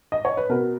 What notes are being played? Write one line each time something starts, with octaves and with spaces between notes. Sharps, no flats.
D#5
C#5
B4
B2 A#4